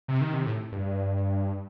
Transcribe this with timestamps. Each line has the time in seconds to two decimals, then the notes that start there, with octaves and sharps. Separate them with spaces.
0.08 C3
0.21 D#3
0.34 C3
0.46 A2
0.72 G2